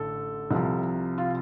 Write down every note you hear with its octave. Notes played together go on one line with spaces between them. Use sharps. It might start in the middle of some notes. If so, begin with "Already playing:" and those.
Already playing: A1 D3 A4
C2 C3 F3
F4